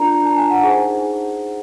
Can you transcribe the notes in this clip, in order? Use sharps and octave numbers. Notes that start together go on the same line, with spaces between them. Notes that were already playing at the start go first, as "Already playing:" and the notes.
Already playing: D4 F4 A#4 D5 A#5
A5
G#5
F#5
D#4 G#4 C5